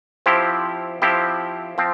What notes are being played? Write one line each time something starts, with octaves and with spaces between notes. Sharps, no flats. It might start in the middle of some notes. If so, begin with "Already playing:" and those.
F3 C4 E4 G4
F3 C4 E4 G4
F3 C4